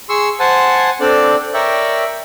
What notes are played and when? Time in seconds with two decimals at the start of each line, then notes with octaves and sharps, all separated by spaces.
0.09 G#4 C6 C#6 E6
0.40 C5 F#5 G#5 A5
1.01 C4 D4 A4 D5
1.54 A#4 C#5 D5 E5 G5